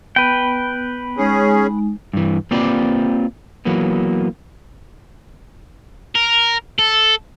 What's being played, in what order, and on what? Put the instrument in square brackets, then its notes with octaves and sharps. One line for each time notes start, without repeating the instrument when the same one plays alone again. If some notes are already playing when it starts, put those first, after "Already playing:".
[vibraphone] B3 [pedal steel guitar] B4 G5
[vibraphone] G#3 D#4 [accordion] C#4 G#4
[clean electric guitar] G2 E3
A#3 C4 F4 G4 B4 D5
E3 F#3 A#3 B3
[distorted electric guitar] A#4
A4